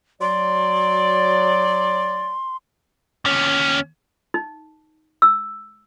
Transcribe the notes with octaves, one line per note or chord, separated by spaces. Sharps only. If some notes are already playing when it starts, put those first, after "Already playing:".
F#3 D5 C6
D#2 C#4
D#4
E6